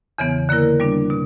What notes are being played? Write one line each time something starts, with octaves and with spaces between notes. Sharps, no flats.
E2 C#3 E3 B3
D3 A#3 E4 A#4
G3 B3 D4
B2